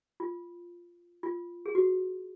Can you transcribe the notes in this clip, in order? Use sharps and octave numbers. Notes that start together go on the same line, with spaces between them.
F4
F4
G#4
F#4